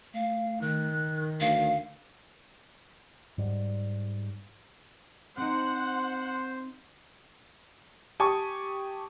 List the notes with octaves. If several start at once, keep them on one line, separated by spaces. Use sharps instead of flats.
A3 F5
D#3 F#6
D2 F5
G#2 G3
C4 D#4 C5 F#5 C6
G4 G#5 A5 C#6 D#6